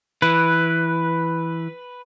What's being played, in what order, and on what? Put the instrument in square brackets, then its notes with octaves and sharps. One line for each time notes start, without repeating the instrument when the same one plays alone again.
[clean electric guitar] E3 [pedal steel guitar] B4